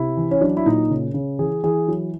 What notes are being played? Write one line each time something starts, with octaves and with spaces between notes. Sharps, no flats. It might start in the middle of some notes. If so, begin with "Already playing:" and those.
Already playing: C3 E4
E3
C#4
F#3 D4
E4
A#2 D#4
C#3
C#3
E3 G#4
E3 G#4
F#3